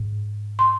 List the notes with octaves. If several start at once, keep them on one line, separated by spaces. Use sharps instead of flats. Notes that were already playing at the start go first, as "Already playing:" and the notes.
Already playing: G#2
C6